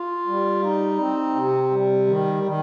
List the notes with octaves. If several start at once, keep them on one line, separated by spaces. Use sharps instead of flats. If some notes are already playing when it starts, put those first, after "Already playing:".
Already playing: F4
G3
D#4
C4
C3
G3
D#3
D#3